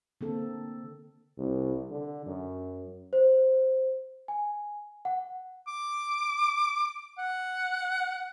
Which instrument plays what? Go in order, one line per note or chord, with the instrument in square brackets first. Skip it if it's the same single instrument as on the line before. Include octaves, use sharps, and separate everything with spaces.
[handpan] D3 A#3 C4 A4
[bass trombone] C2
D3
F#2
[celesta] C5
G#5
F#5
[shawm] D6
F#5